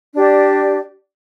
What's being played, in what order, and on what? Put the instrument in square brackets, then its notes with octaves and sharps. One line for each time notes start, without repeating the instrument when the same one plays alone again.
[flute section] D4 G4 D5